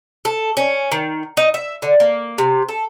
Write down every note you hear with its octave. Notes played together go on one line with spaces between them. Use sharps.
A4
C#4
D#3
D#4
E5
D3
A#3
C3
A4